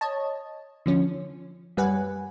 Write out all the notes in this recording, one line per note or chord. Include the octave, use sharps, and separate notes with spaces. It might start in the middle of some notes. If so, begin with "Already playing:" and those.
C#5 D#5 A5
D3 F3 C#4
F#2 G3 B4 F#5 G#5